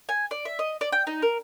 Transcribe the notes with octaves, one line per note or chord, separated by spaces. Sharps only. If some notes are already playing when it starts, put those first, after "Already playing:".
G#5
D5
E5
D#5
D5
G5
D#4
A#4